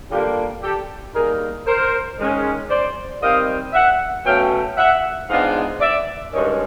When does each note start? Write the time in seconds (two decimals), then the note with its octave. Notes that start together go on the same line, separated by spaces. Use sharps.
0.10 D3 G3 A#3 D4 F4 G4
0.62 G4 A4
1.14 D#3 G3 A#3 G#4 A#4
1.66 A#4 C5
2.18 D#3 G#3 C#4
2.69 C5 D5
3.21 D#3 G3 C4 D#5 F5
3.73 E5 F#5
4.25 B2 F#3 A3 C#4 F5 G5
4.76 E5 F#5
5.29 G#2 F3 G#3 B3 D4 D#5 F5
5.81 D5 E5
6.32 G2 D#3 G#3 C#4 C#5 D#5